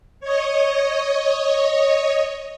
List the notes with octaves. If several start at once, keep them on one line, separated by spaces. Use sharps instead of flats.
C#5 D#5